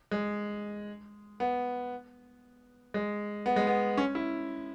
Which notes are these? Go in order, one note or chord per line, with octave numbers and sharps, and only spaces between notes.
G#3
B3
G#3
B3
G#3
B3
C#4
E4